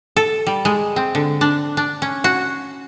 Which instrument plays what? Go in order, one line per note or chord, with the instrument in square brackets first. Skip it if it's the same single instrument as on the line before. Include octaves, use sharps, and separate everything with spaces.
[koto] A4
G3
G#3
C4
D3
D4
D4
C#4
F#4